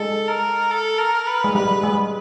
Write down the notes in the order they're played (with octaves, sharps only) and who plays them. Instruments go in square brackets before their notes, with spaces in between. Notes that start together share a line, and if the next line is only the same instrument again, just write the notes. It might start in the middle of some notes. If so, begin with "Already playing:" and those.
Already playing: [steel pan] G#3 [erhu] A4
[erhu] A#4
A4
A#4
B4
[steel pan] G#3
[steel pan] G3 [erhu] B4
[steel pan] G#3